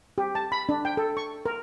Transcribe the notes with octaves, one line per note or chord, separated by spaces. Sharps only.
G4
A5
B5
D4
G5
A4
C#6
A#4